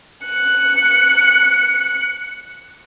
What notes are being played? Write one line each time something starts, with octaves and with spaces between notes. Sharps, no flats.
F#6 C#7